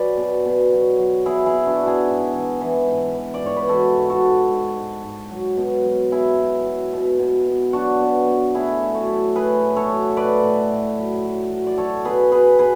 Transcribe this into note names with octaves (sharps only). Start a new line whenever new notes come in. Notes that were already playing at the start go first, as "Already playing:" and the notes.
Already playing: F#3 G#4 B4 D5
B2
B2
F#3
F#3
B2 E4 G#4
E4 G#4
B2
D4 F#4
B2
E4 G#4
G#2
E3
E3
G#2
E3
D5
G#2 C#5
B4
E3 F#4 A4
G#2
F#4 A4
G#2
G#2
G#2
G#2
F#3
B2
F#3
B2 E4 G#4
B2
F#3
B2
B2
B2
F#3 D4 F#4
B2
B2
A2 E4 G#4
A2
F#4 A4
F#3
A2 G#4 B4
A2
A4 C#5
F#3
A2 B4 D5
A2
A2
F#3
F#3
F#3
D5
F#3 A4 C#5
B2 G#4 B4
B2 G#4 B4
B2 G#4 B4